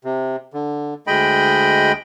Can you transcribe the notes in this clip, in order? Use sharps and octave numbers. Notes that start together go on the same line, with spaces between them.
C3
D3
D2 G#3 D#5 G5 B5